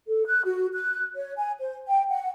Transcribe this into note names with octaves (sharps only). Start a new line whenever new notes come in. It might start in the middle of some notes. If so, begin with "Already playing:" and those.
A4
F#6
F#4
F#6
C#5
G#5
C5
G5
F#5